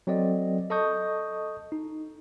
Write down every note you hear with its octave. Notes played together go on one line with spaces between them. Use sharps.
F#3 C4 A4 D5 D#5
A4 D#5 A5 C#6 D#6 G6
D#4